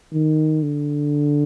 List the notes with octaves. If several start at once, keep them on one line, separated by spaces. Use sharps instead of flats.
D#3
D3